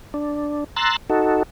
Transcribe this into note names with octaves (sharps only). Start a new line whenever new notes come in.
D4
A#5 C6 E6 F#6 A6
D#4 F#4 A4